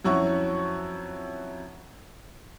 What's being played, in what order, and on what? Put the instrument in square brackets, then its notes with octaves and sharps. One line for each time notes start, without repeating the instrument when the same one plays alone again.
[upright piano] F2 F#3 C#4 E4 F#4 C#6